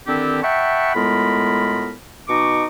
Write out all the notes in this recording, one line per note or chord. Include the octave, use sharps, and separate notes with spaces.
D3 D#3 C4 D4 E4 G4
E5 F#5 G5 A5 B5 C#6
A2 G#3 B3 F4 A#4 B5
B2 D#4 D#5 C#6 D6